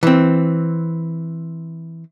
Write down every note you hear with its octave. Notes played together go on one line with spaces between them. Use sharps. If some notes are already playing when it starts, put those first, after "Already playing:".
E3 C4